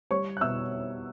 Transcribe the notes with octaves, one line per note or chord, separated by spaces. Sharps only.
G3 C#5 C#6
F#6
B2 E5 E6